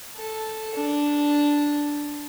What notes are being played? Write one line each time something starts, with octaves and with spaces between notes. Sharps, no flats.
A4
D4